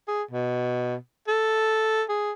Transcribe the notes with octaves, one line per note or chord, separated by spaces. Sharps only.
G#4
B2
A4
G#4